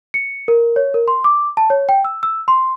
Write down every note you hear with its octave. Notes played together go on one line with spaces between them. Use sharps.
C#7
A#4
C#5
A#4
C6
D6
A5
C#5
G5
E6
E6
C6